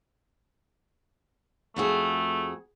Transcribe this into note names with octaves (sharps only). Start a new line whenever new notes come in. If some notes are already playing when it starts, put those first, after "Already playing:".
F2 A3 F#4 G#4